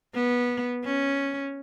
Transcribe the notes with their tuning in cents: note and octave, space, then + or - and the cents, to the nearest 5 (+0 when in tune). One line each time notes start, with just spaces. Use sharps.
B3 -15
C#4 +0